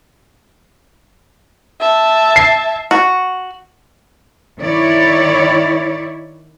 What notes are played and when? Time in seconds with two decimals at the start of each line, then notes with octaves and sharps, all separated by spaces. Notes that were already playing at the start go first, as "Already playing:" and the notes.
1.80 E5 A5
2.36 C7
2.91 F#4
4.61 D#3 E4 C#5 D5